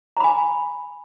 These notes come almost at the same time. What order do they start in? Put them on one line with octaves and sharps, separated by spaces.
A#5 B5 G#5